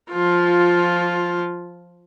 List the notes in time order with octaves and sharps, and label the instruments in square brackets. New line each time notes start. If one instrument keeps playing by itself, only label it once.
[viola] F3 F4